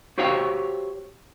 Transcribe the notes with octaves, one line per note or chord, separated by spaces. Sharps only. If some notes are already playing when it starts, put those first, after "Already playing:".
F#4 G4 C5 C#5 F5 G5